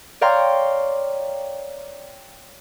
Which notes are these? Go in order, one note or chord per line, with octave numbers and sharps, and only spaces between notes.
C#5 D5 F5 G5 A#5 C6